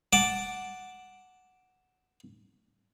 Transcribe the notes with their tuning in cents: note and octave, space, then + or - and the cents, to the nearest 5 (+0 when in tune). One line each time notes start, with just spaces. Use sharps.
F#5 +0 A5 +0 D6 +0